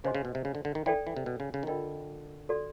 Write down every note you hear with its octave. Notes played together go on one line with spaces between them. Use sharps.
C#3 G#4 C5 D#5 G#5 C6
C#3
B2
C3
C#3
D3
D3
D#3
E3 A4 D5 G5
E3
C3
B2
C#3
C#3
D#3
D3 F4 A#4 D#5 G5
F#4 A4 D5